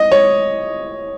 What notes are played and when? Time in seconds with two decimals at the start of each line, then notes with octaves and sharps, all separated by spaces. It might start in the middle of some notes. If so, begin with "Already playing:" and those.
Already playing: D#5
0.12 C#5